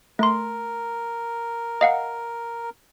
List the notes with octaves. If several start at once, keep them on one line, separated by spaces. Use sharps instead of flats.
A3 A#4 C6
D#5 F5 F#5